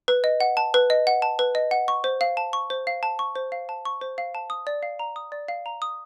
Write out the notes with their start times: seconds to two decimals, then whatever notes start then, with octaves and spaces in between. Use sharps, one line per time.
0.08 B4
0.24 D#5
0.40 F#5
0.57 A5
0.74 B4
0.90 D#5
1.07 F#5
1.22 A5
1.39 B4
1.55 D#5
1.71 F#5
1.88 C#6
2.04 C5
2.21 F5
2.37 A5
2.53 C#6
2.70 C5
2.87 F5
3.03 A5
3.19 C#6
3.35 C5
3.52 F5
3.69 A5
3.85 C#6
4.01 C5
4.18 F5
4.35 A5
4.50 D#6
4.67 D5
4.83 F5
4.99 A#5
5.16 D#6
5.32 D5
5.48 F5
5.66 A#5
5.82 D#6